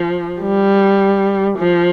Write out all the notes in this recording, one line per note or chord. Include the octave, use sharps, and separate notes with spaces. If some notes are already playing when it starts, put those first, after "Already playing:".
Already playing: F3
G3
F3